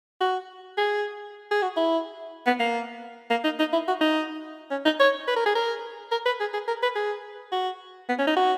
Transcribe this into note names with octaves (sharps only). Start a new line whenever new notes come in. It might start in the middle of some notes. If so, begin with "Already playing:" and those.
F#4
G#4
G#4
F#4
E4
B3
A#3
A#3
D#4
D#4
E4
F#4
D#4
C#4
D#4
C#5
B4
A#4
G#4
A#4
A#4
B4
G#4
G#4
A#4
B4
G#4
F#4
B3
C#4
D#4
F#4